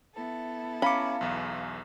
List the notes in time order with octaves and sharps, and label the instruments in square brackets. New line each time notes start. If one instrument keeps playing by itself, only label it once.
[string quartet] B3 E4 A4
[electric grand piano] C#4 D6 [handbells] F5 A#5 C#7 [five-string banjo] B5
[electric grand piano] B1 E2